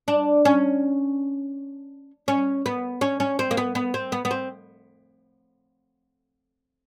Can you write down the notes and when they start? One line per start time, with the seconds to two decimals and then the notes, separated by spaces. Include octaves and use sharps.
0.08 D4
0.45 C#4
2.28 C#4
2.66 B3
3.01 C#4
3.20 C#4
3.39 C4
3.51 A#3
3.57 B3
3.75 B3
3.94 C4
4.12 B3
4.25 B3
4.31 C4